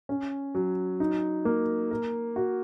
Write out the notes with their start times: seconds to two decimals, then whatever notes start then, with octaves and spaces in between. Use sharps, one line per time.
0.09 C#4
0.55 F#3
1.00 D#4
1.45 A#3
1.91 A#4
2.36 F#4